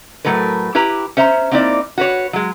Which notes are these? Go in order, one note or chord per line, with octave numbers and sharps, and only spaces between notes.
A2 F#3 A3 A#4 B4
E4 G4 B4 A#5
C#4 C5 E5 A#5
A#3 C4 D#4 E4 D5
F#4 B4 C#5
F#3 G#3